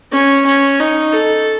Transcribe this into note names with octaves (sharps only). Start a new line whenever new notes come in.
C#4
C#4
D#4
A4